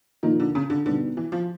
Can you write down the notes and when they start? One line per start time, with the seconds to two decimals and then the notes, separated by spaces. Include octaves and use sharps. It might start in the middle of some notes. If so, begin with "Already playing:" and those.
0.23 A#2 D#3 F3 A#3 D#4
0.40 D3
0.55 C#3
0.70 D3
0.86 B2 D3 G3 B3 D#4
1.17 E3
1.32 F3